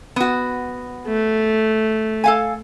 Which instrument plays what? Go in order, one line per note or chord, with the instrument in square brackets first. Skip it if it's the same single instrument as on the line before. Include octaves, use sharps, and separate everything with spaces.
[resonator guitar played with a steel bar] B3 F#4
[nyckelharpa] A3
[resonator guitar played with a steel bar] A4 F5 G#5